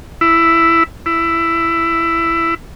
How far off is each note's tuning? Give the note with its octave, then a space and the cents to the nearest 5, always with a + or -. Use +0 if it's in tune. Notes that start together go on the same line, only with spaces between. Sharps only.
E4 +10
E4 +15